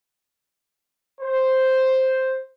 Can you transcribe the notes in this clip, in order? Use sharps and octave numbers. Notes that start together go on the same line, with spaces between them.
C5